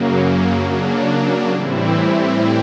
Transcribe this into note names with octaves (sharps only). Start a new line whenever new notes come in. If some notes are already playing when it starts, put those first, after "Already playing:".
Already playing: F#2 C#3 F#3 A#3
C#3 F#3 A#3 D4
A2 E3 G3 C4 E4